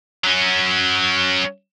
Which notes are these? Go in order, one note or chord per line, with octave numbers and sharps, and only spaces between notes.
F#3 C#4